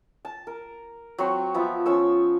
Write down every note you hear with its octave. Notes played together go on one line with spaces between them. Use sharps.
A5
A#4
F#3 C4 C#6
F3 B3 E5
F3 C#4 C#5 E6